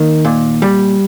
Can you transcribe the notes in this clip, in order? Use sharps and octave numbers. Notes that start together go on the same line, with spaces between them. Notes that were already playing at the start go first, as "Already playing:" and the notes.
Already playing: D#3 A#3
A#2
G3